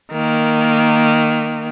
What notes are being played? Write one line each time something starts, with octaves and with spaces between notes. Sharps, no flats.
D#3 A#3